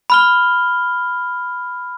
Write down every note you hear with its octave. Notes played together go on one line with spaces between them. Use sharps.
B5 F6 G7